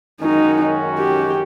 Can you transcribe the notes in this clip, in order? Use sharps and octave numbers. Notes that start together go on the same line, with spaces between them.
F#2 D#3 G#3 C#4 D#4 F#4
G4